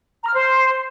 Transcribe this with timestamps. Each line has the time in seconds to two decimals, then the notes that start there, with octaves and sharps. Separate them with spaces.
0.23 A#5
0.28 F6
0.33 C5